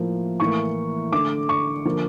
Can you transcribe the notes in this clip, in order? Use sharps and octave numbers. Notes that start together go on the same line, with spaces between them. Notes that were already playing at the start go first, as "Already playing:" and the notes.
Already playing: A2 F3 A#3
A2 E3 A#3 C#6
D3 A3 D6
C#6
D3 F3 A#3